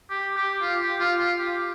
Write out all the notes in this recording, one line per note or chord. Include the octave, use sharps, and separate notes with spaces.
G4
G4
F4
G4
F4
F4
G4